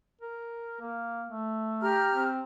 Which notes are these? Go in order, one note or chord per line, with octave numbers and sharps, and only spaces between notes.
A#4
A#3
A3
G4 A#5 F6
C4